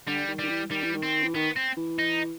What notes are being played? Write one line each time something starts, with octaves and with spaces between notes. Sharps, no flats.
D3 G3
D#3
D#3 G3
E3
D#3 G3
E3
D#3
C4
E3
D#3 B3
C4
E3
D#4